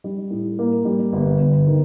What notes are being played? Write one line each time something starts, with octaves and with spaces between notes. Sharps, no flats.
G3
A2
A#3
G3
G1
G1
D#3